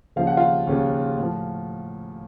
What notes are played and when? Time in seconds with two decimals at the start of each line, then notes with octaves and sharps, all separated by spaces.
0.16 D#2 C#3 F3 F5
0.27 F#5
0.37 F4 F5
0.67 D#2 C#3 F3
1.18 A2 F3